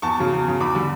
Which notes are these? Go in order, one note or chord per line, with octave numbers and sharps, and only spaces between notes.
E2 A5 C#6
C#3 F#3
E2
C#3 F#3
E2 B5 D6
D3 G3